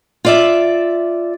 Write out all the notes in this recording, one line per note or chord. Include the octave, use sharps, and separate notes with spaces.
F4 D5 E5